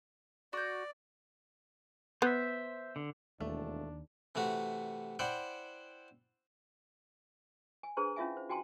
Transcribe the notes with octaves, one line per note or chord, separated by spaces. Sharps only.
F#4 D5 G6
B3 C5 E5
D3
E1 D#2 A3 D4
C3 E3 A3 F#4
E4 C5 D5 F#5 G5
G#5
D4 G#4 B4 C5 A#5 C6
C#4 E4 F4 E5 F5 G#5
C5
F#4 G5 G#5 A#5 C6